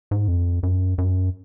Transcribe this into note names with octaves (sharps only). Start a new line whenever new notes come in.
G#2
F2
F#2
F#2